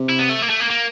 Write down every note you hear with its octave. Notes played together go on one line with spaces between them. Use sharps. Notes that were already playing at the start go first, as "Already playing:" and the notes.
Already playing: C3
E4
B3
A3
A#3
A3
A#3
A#3